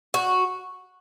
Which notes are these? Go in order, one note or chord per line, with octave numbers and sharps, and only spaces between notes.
F#4